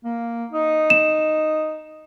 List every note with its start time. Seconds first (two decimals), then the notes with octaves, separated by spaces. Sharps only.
0.05 A#3
0.51 D#4
0.90 E7